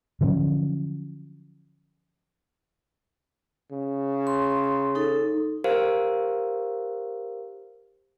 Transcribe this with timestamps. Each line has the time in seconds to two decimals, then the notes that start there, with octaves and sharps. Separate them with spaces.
0.21 D3 F3 F#3 C#4
3.72 C#3
4.27 C6
4.95 D#4 A4
5.64 G4 A#4 C5 F5